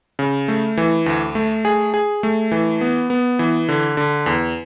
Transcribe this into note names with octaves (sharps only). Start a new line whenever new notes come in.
C#3
A3
E3
D2
A3
G#4
G#4
A3
E3
B3
B3
E3
D3
D3
E2